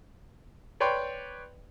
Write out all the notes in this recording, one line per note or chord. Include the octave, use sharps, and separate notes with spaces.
B4 C#5 D5 G5 C6